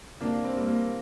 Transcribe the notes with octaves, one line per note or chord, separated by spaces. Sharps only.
C3 A#3 D4
C4
G3 A#3
A#3